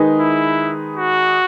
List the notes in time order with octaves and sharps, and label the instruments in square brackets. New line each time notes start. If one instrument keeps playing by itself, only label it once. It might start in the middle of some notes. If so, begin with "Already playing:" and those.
Already playing: [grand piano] D#3 G#3 D#4 G#4 B4
[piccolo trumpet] E4
F#4